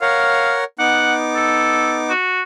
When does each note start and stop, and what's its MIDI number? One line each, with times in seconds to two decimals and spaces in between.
0.02 0.64 70
0.02 0.64 73
0.02 0.56 77
0.02 0.64 78
0.79 2.12 59
0.79 2.12 63
0.79 1.13 78
0.79 2.12 86
1.35 1.96 69
2.09 2.42 66